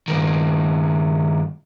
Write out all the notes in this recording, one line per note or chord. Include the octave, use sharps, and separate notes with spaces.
G2 D#3